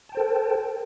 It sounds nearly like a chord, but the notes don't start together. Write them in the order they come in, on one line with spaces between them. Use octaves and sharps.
A5 G5 C5 A4 A#4